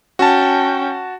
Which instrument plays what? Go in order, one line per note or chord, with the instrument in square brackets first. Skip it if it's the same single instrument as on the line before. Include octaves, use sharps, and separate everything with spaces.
[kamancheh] C#4 G5 [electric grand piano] F#4 A5